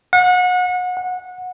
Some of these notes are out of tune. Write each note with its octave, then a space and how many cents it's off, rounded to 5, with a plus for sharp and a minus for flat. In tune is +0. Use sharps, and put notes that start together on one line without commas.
F#5 -30
F#5 -20